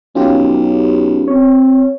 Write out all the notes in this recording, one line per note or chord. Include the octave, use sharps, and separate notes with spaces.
B1 C#4 F4 G4
C4 C#5